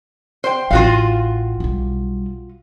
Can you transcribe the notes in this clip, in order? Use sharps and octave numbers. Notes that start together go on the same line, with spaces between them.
C5 G5
A1 E3 F4 F#4 F5
B1 G3